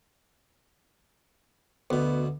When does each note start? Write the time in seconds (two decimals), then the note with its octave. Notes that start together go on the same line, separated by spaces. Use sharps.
1.90 D2 B2 B3